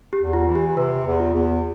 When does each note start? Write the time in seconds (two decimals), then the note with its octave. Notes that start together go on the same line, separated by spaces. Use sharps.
0.13 G4
0.20 E2
0.33 F4
0.48 E3
0.55 G4
0.76 C3 B4
1.06 E2
1.20 F4
1.34 E2